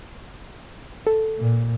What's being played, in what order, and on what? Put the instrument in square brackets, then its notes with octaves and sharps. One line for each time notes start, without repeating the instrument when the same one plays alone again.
[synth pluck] A4
[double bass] A#2